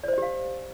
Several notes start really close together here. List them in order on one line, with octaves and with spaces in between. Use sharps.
D5 C5 D#5 G4 F5